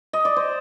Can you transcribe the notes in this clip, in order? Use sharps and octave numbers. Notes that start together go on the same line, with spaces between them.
D#5
D5
C5